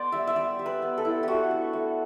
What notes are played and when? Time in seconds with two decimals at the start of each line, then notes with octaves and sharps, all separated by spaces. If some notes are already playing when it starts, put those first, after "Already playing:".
Already playing: B3 C5 D5
0.12 G3 E5
0.27 E5
0.35 G3 D5
0.59 G3
0.66 B4
0.82 B3
0.98 A4
1.05 E4
1.23 A3 F#4 G4
1.51 D4
1.73 A3